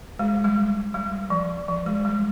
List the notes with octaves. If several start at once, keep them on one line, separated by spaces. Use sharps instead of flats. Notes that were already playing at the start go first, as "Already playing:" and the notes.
G#3
G3
G3
F3
F3
G#3
G3